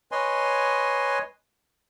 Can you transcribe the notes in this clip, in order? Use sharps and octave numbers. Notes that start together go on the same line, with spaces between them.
B4 C#5 D#5 G#5 C6